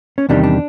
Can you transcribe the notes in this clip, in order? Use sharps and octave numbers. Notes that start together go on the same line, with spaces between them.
C#4
E2 C3 D#3 G3 D4
D4